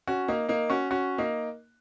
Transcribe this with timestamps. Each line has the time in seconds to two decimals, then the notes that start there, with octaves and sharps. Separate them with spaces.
0.07 C#4 F#4
0.28 A#3 D#4
0.49 A#3 D#4
0.70 C#4 F#4
0.91 C#4 F#4
1.18 A#3 D#4